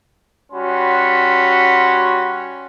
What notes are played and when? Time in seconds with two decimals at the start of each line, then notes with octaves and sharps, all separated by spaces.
0.52 G3 C#4 F#4 B5 C6